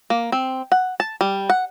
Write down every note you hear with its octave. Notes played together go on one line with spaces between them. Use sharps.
A#3
C4
F#5
A5
G3
F#5